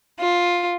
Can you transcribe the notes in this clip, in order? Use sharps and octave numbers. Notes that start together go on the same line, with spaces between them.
F4